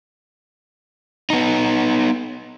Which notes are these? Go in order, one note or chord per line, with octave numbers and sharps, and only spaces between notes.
B3 D#4